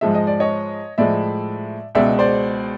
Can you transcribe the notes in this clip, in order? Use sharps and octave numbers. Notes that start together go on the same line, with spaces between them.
G#2 F3 G#3 E5
D#5
D5
C#5 D#5
A2 F3 G#3 D5 E5
C#2 B2 G#3 D5 E5
C5 D5